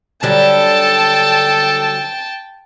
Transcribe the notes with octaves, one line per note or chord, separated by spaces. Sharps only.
D3 F#3 G3 A4 G5 A5